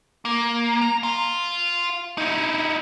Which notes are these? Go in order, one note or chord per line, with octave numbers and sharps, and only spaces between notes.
A#3
A#5
F5 C6
D#4 E4